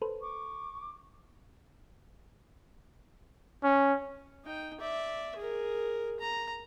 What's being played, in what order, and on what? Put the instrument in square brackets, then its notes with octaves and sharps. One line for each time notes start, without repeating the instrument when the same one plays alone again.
[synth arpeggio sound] A4 B4 C5
[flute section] C#6 D6
[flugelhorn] C#4
[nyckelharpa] D#4 G5
D5 E5
G#4 A#4
A#5